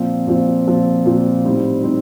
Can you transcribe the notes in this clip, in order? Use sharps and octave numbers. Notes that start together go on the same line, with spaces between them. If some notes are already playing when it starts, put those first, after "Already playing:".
Already playing: A#2 F3 C4
A#2 F3 C4
A#2 F3 C4
A#2 F3 C4
A2 G3 C4 D#4
A2 G3 C4 D#4